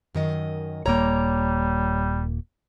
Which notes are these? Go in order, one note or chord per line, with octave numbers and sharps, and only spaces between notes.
F#2 D#3 D#5
D#1 G3 A#3 C#5 A#5